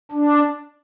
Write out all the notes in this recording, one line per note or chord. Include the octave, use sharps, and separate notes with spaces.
D4